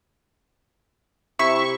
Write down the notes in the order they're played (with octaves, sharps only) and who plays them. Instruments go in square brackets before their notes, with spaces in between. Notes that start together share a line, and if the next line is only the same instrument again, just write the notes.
[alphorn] C3 [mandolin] E4 [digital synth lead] C#6